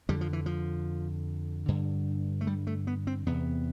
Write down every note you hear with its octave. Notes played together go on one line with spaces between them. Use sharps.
F2 D3 G3
F3
E3
F3
G2 D3
A3
G3
A3
B3
C4
E2 C3 B3